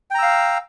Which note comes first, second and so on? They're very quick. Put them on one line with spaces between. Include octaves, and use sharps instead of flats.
G5 A#5 E6 F5